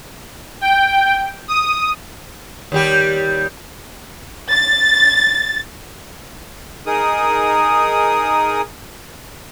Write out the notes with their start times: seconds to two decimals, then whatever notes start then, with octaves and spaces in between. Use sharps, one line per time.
0.61 G5
1.48 D#6
2.72 D#2 G3 G4
4.53 A6
6.87 D#4 G#4 A#4 D#6